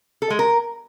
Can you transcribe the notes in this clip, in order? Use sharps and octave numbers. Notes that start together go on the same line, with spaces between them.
A4
G#3
A#4